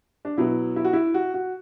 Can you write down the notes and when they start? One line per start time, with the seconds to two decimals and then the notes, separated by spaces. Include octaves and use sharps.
0.25 D4
0.37 B2 F#3 B3 E4
0.76 E4
0.85 F#4
0.93 E4
1.14 F#4
1.34 F#4